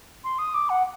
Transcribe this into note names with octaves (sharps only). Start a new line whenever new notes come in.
C6
D#6
D6
F#5